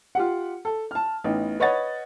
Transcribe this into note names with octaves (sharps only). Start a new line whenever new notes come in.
F4 G4 F#5
A4
A5 F6
A1 B3 D#4
B4 C#5 D#5 F#5 A6